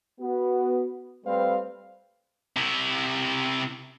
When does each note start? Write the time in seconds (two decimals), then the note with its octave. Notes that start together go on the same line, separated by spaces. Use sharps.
0.20 B3 F#4
1.25 G3 A3 C4 B4 C5 F5
2.56 C3 E4